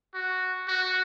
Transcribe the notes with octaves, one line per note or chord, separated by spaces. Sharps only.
F#4
F#4